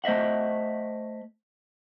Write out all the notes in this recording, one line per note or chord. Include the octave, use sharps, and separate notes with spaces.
A3 C5 D#5 E5 F#5